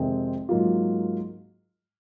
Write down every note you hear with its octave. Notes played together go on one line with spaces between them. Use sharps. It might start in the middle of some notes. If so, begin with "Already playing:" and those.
Already playing: F2 C3 D#3 G#3 C4
G#2 F#3 A#3 F4